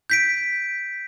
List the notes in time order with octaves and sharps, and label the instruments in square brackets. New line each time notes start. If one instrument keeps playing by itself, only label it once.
[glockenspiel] G6 B6 D7